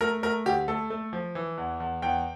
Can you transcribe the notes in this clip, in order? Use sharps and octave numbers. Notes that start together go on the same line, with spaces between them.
A3 A#4
A3 A#4
D2 G4
A3 A4
A3
F3
E3
E2
E2
E2 G5